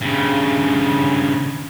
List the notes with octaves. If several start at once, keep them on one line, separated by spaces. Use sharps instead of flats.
G2 C#3